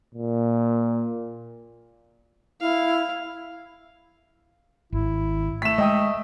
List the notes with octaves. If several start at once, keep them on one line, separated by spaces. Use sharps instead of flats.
A#2
E4 F5
G#1 E4
A3 B6 E7
G#3 D#5 G5 D#6